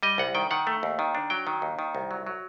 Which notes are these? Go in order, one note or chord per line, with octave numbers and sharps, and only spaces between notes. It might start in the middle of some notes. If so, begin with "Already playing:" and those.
G3 D#5
C2 F#5
D#3 G5
D#3 F#5
A3
D#2
D#3
D4
F#3 G5
D#3
D#2
D#3
C2
F#3
F#3